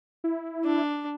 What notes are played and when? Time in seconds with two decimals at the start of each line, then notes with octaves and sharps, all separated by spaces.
0.24 E4
0.64 D4